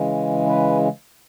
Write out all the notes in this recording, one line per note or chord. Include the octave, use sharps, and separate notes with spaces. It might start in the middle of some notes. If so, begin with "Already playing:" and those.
Already playing: C#3 E3 G#3
B4